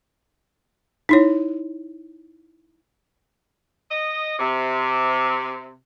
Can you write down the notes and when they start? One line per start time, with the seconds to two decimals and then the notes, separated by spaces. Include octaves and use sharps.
1.09 D#4 E4 C#5
3.91 D#5
4.38 C3